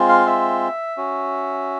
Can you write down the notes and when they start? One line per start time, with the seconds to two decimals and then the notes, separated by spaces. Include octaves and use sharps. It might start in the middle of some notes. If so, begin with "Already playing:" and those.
Already playing: G#3 C4 F4
0.09 F5
0.26 E5
0.97 C#4 F#4